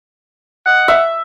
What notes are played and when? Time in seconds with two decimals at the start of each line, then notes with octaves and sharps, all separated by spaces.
0.66 D#5 F#5
0.88 E5